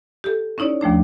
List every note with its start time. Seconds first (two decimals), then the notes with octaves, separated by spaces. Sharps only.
0.24 G4 A4
0.58 C#4 D#4 E4 C#5 D5
0.81 D#2 F3 A3 D4